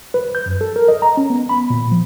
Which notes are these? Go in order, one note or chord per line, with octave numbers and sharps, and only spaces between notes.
B4
G6
F#2
A4
A#4
D#5
A#5
C#4
B3
B5
A#2
F3